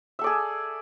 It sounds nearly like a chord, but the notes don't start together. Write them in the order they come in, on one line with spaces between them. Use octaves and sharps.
E5 A4 D5 G#4